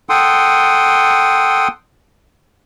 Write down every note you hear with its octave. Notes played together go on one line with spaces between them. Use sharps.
A4 F#5 G5 C6 D#6